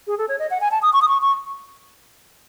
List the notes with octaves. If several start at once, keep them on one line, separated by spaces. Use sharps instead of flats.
G#4
A4
C#5
D#5
F#5
G#5
A5
D#6
C#6
D#6
C#6
C#6